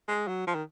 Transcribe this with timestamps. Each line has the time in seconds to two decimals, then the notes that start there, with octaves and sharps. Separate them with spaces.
0.08 G#3
0.28 F#3
0.47 F3
0.55 D#3